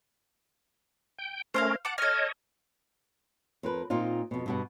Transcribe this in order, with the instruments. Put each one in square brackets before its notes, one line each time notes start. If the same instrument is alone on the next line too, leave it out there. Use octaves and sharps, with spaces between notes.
[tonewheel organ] G5
[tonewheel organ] A3 C#4 A#4 [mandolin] C5 C#5 F5
[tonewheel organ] F#5 [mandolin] A5 D6
[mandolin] A4 F6 [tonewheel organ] C#5 D#5
[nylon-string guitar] F2 A#4 B4
A#2 C4 D#4 F4
F2 B2
G2 B2 F#5